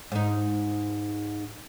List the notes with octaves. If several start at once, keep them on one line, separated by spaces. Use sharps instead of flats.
G#2 D#4